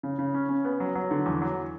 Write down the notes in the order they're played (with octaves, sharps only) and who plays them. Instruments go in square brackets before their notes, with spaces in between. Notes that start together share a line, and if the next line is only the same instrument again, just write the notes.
[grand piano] C#3
C#3
C#4
C#4
B3
F#3
F#3
D3
E2
F#3